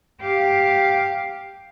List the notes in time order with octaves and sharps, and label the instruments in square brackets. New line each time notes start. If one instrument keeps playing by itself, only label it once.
[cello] G4 F5